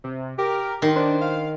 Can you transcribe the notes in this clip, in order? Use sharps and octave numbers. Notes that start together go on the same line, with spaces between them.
C3
G4 A#4
D#3 C6
D4 C5
F5